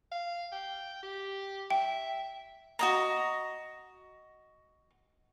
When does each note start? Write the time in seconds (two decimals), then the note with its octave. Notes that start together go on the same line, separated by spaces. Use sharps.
0.12 F5
0.52 G5
1.03 G4
1.70 E5 G5
2.79 F#4 D#5 A#5